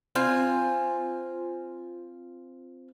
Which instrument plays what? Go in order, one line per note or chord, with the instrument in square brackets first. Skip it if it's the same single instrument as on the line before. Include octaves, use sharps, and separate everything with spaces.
[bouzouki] C4 F4 G#5